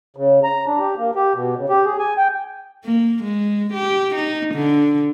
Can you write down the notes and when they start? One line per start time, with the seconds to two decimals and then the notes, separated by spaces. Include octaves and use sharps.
0.17 C#3
0.44 A#5
0.66 D4
0.79 G4
0.97 A#3
1.15 G4
1.35 B2
1.57 C#3
1.69 G4
1.86 G#4
1.99 G#5
2.17 G5
2.84 A#3
3.24 G#3
3.74 G4
4.15 D#4
4.54 D3